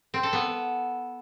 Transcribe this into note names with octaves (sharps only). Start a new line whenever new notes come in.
C4
A4
B3